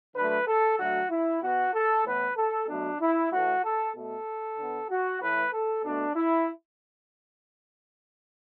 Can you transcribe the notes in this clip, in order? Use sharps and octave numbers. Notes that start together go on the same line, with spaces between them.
D3 F#3 A3 B4
A4
D3 F#3 A3 F#4
E4
B2 B3 F#4
A4
A2 E3 B3 B4
A4
B2 F#3 A3 D4
E4
A2 E3 A3 F#4
A4
B2 A3 A4
D3 B3
F#4
A2 E3 A3 B4
A4
B2 A3 D4
E4